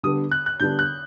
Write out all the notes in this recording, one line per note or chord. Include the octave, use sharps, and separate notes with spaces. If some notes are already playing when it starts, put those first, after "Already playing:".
D3 G3 B3 D4 D#6
F#6
F#6
D3 G3 B3 D4 G6
F#6